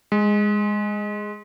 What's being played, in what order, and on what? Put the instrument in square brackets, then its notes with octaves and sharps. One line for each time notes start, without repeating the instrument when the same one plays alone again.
[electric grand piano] G#3